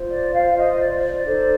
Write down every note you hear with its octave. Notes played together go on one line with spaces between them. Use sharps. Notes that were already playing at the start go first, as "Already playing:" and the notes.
Already playing: F4 C5
D5
F5
D#5
D5
D5
D#4 A4 C5